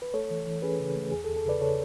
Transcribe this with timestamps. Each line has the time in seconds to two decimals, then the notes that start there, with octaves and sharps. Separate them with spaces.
0.02 B4
0.13 A3 A4 C#5
0.30 E3
0.47 E3
0.62 C#4 G#4 B4
0.80 C#3
0.96 A3
1.12 E2 G#4
1.24 A4
1.28 E2
1.36 A4
1.45 C#3 B4 D5
1.60 C#3 A4 C#5